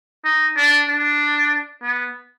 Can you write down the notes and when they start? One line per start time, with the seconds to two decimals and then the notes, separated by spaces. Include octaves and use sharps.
0.25 D#4
0.57 D4
0.88 D4
1.83 B3